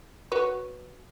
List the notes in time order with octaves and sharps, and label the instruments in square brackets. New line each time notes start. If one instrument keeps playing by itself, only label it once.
[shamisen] F#4 B4 C#5